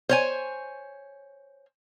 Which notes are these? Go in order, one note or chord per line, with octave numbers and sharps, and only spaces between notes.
C5 C#5 G#5